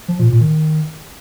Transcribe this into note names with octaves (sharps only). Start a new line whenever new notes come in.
F3
A#2
A#2
D#3